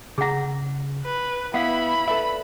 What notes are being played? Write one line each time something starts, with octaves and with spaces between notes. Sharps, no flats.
C#3 G#4 F#5 A#5
B4
B3 E4 F5 F#5 B5
A4 B4 D5 E5